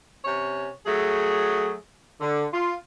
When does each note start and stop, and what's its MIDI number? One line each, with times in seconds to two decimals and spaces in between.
0.24 0.68 48
0.24 0.68 61
0.24 0.68 73
0.86 1.74 54
0.86 1.74 57
0.86 1.74 68
2.21 2.45 50
2.53 2.72 65